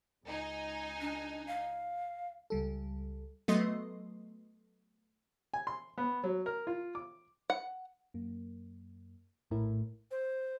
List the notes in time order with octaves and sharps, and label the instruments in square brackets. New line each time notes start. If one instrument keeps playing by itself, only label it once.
[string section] C#2 D#4 G#5
[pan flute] D4
F5
[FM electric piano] C#2 G3 A4
[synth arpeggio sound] F#3 A3 B3 D#5 C6
[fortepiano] G#5
C6
B3
F#3
A#4
F4
D6
[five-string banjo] F#5
[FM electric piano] F#2 A#3
[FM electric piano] A#1 E4 A#4 [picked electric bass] A2
[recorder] C5